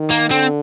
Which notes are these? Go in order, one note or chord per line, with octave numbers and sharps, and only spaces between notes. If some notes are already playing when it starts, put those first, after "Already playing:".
Already playing: D#3
A#3
D3 C4